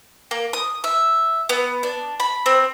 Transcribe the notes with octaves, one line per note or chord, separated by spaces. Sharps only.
A#3
D#6
E5
B3
D4
B5
C4